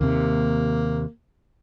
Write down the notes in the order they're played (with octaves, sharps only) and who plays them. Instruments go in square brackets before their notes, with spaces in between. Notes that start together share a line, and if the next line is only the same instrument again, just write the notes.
[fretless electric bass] D#2 C3 [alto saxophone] A#3